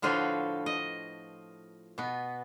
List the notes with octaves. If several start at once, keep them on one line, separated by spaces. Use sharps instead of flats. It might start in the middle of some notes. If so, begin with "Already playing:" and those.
A2 D3 F3 F4 F#4 B4
D#5
B2 B3